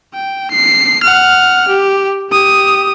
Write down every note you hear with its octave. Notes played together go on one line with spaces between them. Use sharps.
G5
C7
F#5 F6
G4
G4 D#6